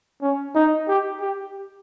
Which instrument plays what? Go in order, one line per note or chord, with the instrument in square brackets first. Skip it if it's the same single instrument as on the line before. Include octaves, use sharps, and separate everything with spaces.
[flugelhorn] C#4
D#4
G4
G4